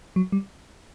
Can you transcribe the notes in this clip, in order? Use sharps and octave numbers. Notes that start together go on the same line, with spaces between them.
F#3
G3